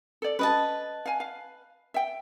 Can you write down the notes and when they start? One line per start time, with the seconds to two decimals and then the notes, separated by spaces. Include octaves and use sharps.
0.22 A4 D5
0.39 C#4 B4 D#5 A5
1.06 F5 G#5
1.20 F5
1.94 E5 G5